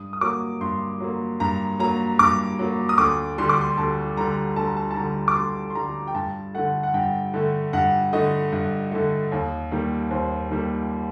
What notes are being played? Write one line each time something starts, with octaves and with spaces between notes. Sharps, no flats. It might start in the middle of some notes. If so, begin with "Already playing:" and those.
Already playing: G2 D#6
D#6
F#3 A#3 D6
G2 C6
F#3 A#3
G2 A#5
F#3 A#3 A#5
G2 D6
F#3 A#3
D#6
D2 D6
D3 G3 C6
D6
C6
D2 A5
D3 G3 A#5
D2 A5
A#5
A5
A5
D3 G3 A#5
D6
D2 C6
C6
D3 G3 A#5
G5
G2 A5
D3 A3 F#5
F#5
G2 G5
D3 A3
G2 F#5
D3 A3 D#5
G2
D3 A3
D#2
D#3 G3 A#3
D#2 C5
D#3 G3 A#3